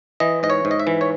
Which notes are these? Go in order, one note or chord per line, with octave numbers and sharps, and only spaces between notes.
E3 D#5
G#2 D#5
C#5
G#2
D#5
E5
E3
C#5